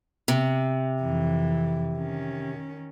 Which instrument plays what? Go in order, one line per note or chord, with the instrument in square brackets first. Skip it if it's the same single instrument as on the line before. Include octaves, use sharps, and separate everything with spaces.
[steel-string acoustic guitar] C3
[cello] F2 E3
D#3 C#4